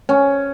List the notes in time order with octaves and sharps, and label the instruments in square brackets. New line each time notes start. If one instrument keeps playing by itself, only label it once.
[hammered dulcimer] C#4